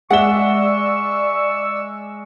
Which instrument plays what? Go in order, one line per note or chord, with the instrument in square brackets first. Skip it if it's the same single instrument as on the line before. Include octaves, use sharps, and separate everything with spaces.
[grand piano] G#3 E5 G7 [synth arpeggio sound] D5 E6 [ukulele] F#5 [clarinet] C#6